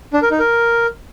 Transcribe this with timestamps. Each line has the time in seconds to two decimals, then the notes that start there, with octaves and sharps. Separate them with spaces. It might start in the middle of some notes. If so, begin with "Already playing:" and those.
0.13 D4
0.22 A#4
0.31 D#4
0.40 A#4